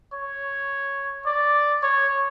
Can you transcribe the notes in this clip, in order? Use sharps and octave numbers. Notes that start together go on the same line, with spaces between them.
C#5
D5
C#5